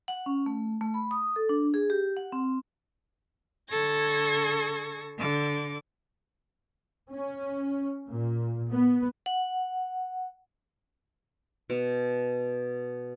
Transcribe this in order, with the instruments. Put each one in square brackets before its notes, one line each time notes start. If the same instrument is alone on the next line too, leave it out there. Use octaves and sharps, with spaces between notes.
[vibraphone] F#5
C#4
A3
A3
B5
D#6
A4
D4
G#4
G4
F#5
C4
[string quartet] D3 A4 C#6 G#6 A#6
D3 D6
[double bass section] C#4
A#2
B3
[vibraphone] F#5
[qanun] B2